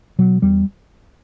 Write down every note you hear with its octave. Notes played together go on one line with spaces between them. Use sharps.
B2 F#3
E2 G3